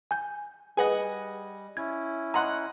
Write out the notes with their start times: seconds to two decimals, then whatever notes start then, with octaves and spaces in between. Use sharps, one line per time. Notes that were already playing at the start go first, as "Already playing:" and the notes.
0.11 G#5 G6
0.77 G3 G#4 B4 D#5 F#5 G#5
1.77 C#4 E4 G#6
2.34 D#5 F#5 A#5 C6 F#6